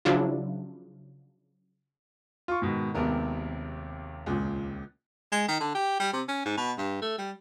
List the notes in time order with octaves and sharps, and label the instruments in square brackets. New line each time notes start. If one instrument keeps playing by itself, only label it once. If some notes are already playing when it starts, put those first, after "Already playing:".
[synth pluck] C#3 F3 F#3 D4 E4 F4
[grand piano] F4 C#6
G#2 B2 D#3
[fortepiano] G#1 B3 A#4 [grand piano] D#2 C3
[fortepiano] C#2 A#2
[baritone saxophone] G#3
D#3
D3
G4
G3
C3
C#4
G#2
B2
G2
A3
G3